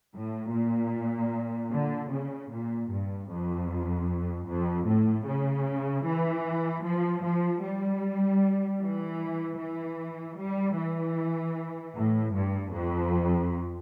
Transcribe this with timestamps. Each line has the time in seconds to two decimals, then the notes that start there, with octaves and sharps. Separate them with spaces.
0.14 A2
0.54 A#2
1.71 D3
2.11 C#3
2.51 A#2
2.90 G2
3.29 F2
4.47 F2
4.87 A2
5.26 C#3
6.05 E3
6.84 F3
7.23 F3
7.62 G3
8.80 E3
9.59 E3
10.39 G3
10.78 E3
11.96 A2
12.35 G2
12.75 F2